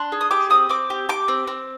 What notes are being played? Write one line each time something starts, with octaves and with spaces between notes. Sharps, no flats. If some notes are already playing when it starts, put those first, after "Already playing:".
Already playing: D4 C6
G#4
D#6
G4 D6
C4 D#6
C4 D6
G4
G4 D6
C4
C4